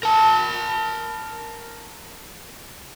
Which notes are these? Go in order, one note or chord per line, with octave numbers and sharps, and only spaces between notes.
A#4 A5